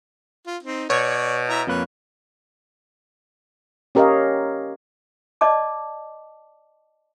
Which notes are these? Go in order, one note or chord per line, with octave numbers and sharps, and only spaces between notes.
F4
C4 D#4
B2 C#5 D5
E4 E5 A#5
F2 A#3 B4 C#5
C#4 G4 A#4 C#5 D#5 F5
D5 D#5 A5 D6